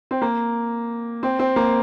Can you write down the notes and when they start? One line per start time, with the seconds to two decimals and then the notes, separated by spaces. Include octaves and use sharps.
0.11 C4
0.22 A#3
1.23 C4
1.39 C4
1.56 A#3